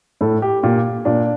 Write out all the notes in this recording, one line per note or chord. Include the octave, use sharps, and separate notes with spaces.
A2 A4
G4
A#2 G4
A#2 D4